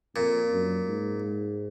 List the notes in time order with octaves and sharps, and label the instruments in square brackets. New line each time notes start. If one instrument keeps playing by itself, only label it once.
[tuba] F2 [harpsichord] A#2
[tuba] F#2
G#2